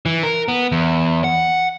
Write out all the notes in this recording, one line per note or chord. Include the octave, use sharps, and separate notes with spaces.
E3
A#4
B3
E2
F#5